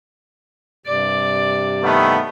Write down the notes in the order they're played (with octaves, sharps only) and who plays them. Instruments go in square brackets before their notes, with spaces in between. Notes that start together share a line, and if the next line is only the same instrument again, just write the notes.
[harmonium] G2 C3 [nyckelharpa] D5
[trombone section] D#3 A3 B3